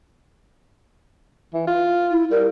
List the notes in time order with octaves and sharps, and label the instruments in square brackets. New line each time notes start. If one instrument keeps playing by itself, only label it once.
[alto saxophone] E3
F4
[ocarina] E4
[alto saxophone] G3 [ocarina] A#4